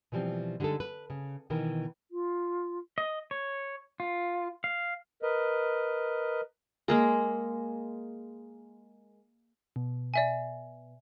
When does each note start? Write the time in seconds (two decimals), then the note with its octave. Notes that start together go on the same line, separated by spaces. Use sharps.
0.12 B2 E3 F3 G3 C4
0.60 D3 G3 G#3 D#4 A4
0.80 B4
1.10 C#3
1.50 B2 D#3 E3 A#4
2.11 F4
2.98 D#5
3.31 C#5
4.00 F4
4.64 F5
5.22 A#4 B4 D#5
6.88 G#3 A#3 G#4
9.76 B2
10.14 D5 E5 G#5